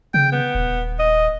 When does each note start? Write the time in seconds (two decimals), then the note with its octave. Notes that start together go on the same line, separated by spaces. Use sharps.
0.14 C#3 G5
0.32 B3
0.55 D#1
1.00 D#5